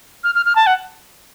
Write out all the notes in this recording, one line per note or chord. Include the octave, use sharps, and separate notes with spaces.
F6
F6
F6
A5
F#5